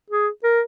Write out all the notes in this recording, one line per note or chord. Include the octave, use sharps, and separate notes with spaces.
G#4
A#4